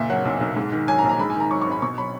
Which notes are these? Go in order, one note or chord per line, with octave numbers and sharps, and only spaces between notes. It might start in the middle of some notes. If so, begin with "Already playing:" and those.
Already playing: F#1 A#2 E5
F#3 F#5
B1
B1
G#2
D#3
F#3 G#5
A#5
A#1
A#5
G#2 B5
G#5
D#3 A#5
F#3 C#6
C#6
G#1
B5
B2 C#6
F#3 B5